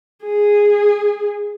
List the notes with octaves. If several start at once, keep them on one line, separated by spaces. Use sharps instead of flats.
G#4